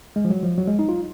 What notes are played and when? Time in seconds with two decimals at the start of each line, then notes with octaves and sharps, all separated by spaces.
0.16 G#3
0.25 F3
0.30 F#3
0.43 F3
0.58 F#3
0.68 G#3
0.79 D#4
0.89 F4